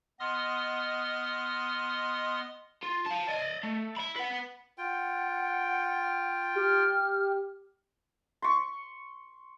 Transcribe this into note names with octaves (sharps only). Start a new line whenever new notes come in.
B3 D#5 C6 D#6 F6
F4
F5 A5
D5 D#5
A3
E4 B5
B4 F#5
F4 F#5 G5
G4 F6
C6 C#6